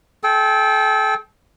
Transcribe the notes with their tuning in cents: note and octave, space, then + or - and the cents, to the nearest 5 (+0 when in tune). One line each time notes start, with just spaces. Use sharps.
A4 -35 G5 +0